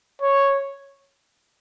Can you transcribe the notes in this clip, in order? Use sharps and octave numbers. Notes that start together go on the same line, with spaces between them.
C#5